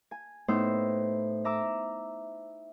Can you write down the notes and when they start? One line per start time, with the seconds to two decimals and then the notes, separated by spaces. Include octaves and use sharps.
0.11 G#5
0.48 A2 B3 D#4 C5 E6
1.45 E5 A#5 D6 E6